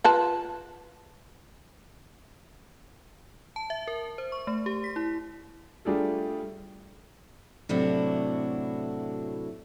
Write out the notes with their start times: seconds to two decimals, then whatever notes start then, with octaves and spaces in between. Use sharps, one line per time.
0.04 F4 B4 A5
3.56 A5
3.70 E5
3.87 A#4
4.18 C5
4.32 C#6
4.47 A3
4.66 G4
4.84 B6
4.96 E4
5.85 G3 A3 D4 F4 G#4 A4
7.69 A2 C3 F#3 D4 E4 F#4